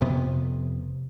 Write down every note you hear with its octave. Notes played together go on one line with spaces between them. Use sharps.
F1 F2 C3 B3